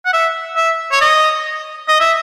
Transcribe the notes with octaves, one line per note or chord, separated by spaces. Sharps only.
F#5
E5
E5
C#5
D#5
D#5
E5